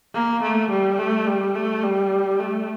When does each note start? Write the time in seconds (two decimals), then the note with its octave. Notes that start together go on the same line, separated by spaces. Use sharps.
0.14 A#3
0.42 A3
0.70 G3
0.99 A3
1.27 G3
1.55 A3
1.83 G3
2.39 A3